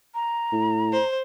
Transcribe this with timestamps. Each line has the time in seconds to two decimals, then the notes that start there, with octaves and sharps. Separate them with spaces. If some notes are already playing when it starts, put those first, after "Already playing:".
0.15 A#5
0.52 A2
0.92 C5